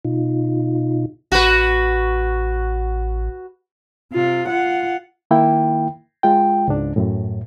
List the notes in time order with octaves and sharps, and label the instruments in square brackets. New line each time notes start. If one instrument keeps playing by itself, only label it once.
[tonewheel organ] B2 D#4 F4
[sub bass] A1 [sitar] F#4 B4
[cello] C3 F4
F4 F#5
[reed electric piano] D#3 A#3 E4 G5
G#3 F4 G5
C#2 G#2 D4
F#2 A2